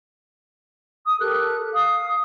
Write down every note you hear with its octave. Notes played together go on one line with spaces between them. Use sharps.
D#6
G4 A4 A#4 F#6
F5 D#6